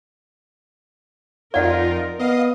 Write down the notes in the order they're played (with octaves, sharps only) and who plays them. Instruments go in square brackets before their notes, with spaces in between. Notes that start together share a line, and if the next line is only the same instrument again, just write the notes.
[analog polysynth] F2 D#4 F4 [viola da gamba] A#4 [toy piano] D5 F#5
[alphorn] B3 [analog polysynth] D#5 F5 D#6